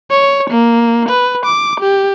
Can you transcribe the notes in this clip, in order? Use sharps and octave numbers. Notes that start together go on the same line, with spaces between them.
C#5
A#3
B4
D6
G4